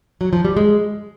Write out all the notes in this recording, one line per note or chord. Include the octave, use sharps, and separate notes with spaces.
F#3
F3
G3
G#3